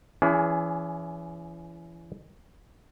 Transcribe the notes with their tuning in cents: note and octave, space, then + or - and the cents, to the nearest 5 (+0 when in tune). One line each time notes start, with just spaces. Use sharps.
E3 +25 C#4 +45 G#4 +0